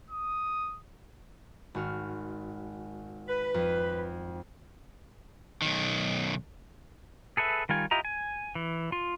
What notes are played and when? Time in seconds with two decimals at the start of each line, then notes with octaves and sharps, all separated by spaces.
0.10 D#6
1.74 G#1 F#4 F6
3.28 B4
3.54 F2
5.62 B1 D#3
7.37 G#4 A4 B4 E5
7.69 D#3 G3 F4 G#5
7.91 E4 F4 G4 D#5 A#5
8.05 G#5
8.55 E3
8.92 F4